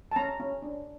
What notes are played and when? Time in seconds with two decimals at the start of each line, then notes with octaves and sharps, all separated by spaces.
0.11 A5
0.16 C#4 A#5
0.40 C#4
0.62 D4